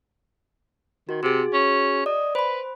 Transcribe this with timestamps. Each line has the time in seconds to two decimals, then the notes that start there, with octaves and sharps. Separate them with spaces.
1.09 D#3 F#4
1.23 C3 F#4 G#4
1.53 C#4
2.06 D5 D#5
2.35 B4 C5 B5